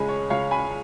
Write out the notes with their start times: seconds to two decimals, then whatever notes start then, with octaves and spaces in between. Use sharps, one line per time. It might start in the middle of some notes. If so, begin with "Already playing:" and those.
Already playing: C#2 C#3 G#3 G#5 B5
0.09 C#5
0.30 C#2 C#5 F5
0.51 G#5 B5